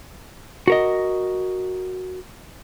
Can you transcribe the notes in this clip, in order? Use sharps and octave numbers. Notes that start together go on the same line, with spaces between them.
F#4 A#4 D#5